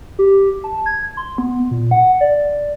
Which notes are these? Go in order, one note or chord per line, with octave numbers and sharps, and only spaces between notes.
G4
A5
G#6
C6
B3
A#2
F#5
D5